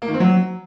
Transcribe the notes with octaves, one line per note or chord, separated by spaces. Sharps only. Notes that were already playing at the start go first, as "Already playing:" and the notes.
A#3
D#3
C4
F#3